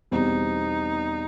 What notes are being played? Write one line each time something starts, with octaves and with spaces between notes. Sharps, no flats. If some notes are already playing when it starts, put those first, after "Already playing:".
E2 B2 G3 C4 D#4